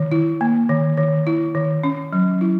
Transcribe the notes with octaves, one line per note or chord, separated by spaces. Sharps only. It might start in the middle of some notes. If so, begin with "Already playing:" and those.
Already playing: D#3
E4
A#3
D#3
D#3
E4
D#3
C#4
F#3
E4